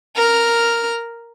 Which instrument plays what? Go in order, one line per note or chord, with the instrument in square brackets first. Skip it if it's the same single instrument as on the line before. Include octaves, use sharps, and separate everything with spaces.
[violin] A#4 F6